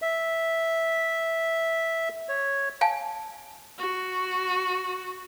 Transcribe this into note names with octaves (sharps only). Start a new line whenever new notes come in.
E5
C#5
F5 G#5 A5
F#4